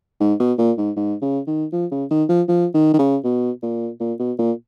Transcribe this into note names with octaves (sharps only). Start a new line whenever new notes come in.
G#2
B2
A#2
G#2
G#2
C#3
D#3
F3
C#3
D#3
F3
F3
D#3
D#3
C#3
B2
A#2
A#2
B2
A#2